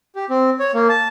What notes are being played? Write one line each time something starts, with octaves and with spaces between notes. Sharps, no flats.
G4
C4
C#5
A#3
A5